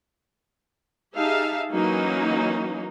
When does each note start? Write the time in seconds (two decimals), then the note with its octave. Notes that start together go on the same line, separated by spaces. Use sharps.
1.17 D#4 G4 G#4 E5 F5 A5
1.72 E3 F#3 A#3 C#4 D#4 F#4